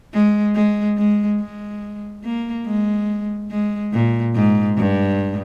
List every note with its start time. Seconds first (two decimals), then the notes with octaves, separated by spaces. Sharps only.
0.13 G#3
0.55 G#3
0.97 G#3
1.40 G#3
2.24 A#3
2.66 G#3
3.51 G#3
3.93 A#2
4.35 G#2
4.77 G2